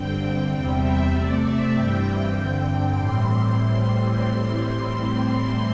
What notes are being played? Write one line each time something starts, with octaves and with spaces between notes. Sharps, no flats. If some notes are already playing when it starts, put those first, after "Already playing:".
Already playing: G2 D3 C4 G5
E2 C3 G3 C4 G5
E5
C3 A3 C4 D5
E5
G2 E3 G3 C4 G5
G2 D3 C4
A2 E3 G3 C4 C6